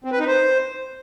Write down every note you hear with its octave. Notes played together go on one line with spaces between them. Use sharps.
C4
B4
D#4
C5